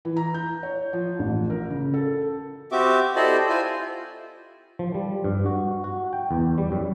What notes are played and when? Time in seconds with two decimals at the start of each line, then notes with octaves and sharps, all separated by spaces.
0.05 E3
0.17 A#5
0.34 G6
0.63 C#5
0.93 F3
1.19 A1
1.50 A#4
1.70 C#3
1.94 A4
2.72 C4 F#4 G4 E5 D6
3.16 E4 G4 A4 C5 D5 D#5
3.49 E4 F4 C5 G#5
4.79 F3
4.94 G3
5.24 G2
5.46 F#4
5.84 F#4
6.13 G5
6.31 E2
6.58 G3
6.72 F#2